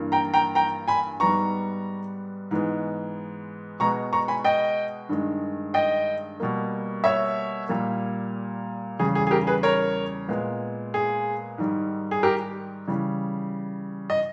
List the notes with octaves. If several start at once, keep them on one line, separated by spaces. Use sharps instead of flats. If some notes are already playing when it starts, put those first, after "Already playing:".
Already playing: G2 E3 A#3
G5 A#5
G5 A#5
G5 A#5
G#5 B5
G#2 G3 B3 A#5 C#6
G#2 E3 G#3 B3
B2 G#3 B3 A#5 C#6
A#5 C#6
G#5 B5
D#5 G5
G2 D#3 G#3
D#5 G5
B2 G3 A#3
C#5 E5
A#2 G3 A#3
E2 C#3 G3 G#4
G#4
G#4
G4 A#4
G#4 B4
A#4 C#5
A#2 G#3 B3
G#4
G#2 D#3 G3
G#4
G4 A#4
C#3 E3 G3
D#5